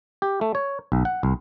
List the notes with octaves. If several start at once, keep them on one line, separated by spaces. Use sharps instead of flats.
G4
A3
C#5
B1
F#5
C2